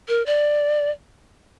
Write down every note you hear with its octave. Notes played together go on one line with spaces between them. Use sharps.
A#4
D5